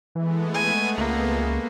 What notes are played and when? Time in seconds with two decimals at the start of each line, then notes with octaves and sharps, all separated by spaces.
0.15 E3 G#3 A3 B3
0.54 G#5
0.98 C#2 A#3